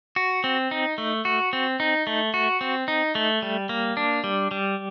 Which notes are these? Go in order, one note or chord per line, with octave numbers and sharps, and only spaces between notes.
F#4
C4
D#4
A3
F#4
C4
D#4
A3
F#4
C4
D#4
A3
G3
A#3
D4
G3
G3